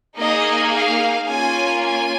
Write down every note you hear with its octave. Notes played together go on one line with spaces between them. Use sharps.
A#3 D#4 G#4 D#5
F5
A#3 C#4 F4 G#5
G#5